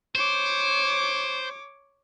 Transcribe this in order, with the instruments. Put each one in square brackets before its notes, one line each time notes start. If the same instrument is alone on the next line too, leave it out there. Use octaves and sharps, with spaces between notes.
[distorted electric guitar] C5 [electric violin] C#5 D6